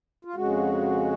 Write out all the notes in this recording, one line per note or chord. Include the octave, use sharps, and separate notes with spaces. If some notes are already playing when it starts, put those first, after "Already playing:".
F4
F2 C#3 G#3 F#4